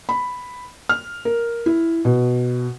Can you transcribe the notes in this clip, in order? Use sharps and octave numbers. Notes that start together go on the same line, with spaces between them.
B5
F6
A#4
E4
B2